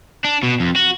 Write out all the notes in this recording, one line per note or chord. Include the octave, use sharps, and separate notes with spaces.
D4
B2
F2
F#4